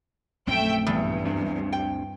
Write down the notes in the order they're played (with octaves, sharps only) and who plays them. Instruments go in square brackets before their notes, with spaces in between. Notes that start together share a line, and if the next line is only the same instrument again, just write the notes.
[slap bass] A#1 F#2 C4 [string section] A3 E5 G5
[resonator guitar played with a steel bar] E2 [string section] G2
[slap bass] D2 C4 D4
[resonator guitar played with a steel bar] G5